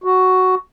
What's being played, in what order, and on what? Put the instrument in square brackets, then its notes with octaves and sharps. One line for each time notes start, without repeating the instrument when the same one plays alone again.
[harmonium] F#4